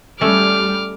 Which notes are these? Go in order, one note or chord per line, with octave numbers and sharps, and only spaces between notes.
G3 A3 C#4 D6 F6